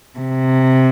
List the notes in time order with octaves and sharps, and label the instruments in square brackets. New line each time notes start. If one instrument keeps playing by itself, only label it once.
[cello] C3